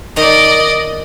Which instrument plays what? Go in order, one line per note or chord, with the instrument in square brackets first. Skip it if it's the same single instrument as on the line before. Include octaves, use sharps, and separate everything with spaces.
[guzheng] D#3 A#5 [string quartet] D5 D#5